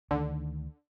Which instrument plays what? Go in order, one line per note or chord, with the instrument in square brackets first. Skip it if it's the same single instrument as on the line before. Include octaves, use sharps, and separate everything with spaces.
[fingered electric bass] D2 D#3 [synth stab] D3